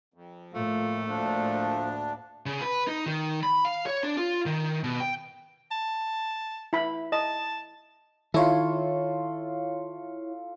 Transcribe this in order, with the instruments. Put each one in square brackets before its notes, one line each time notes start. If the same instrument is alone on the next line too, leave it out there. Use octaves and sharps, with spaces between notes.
[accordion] F2
[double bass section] A2 A#3 [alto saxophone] A3 [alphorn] F4
[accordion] D2 D4 [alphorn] F3
[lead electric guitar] C#3
B4
D#4
D#3
B5
F5
C#5
D4
F4
D#3
B2
G5
[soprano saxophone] A5
[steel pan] E4 B5
[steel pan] D#5 [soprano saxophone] A5
[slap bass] D#3 [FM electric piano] E4 C#5 [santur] F4 A4